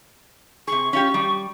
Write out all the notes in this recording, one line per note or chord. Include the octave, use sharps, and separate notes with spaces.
C3 G#4 C#6
C#4 F4 G4 C#6
G3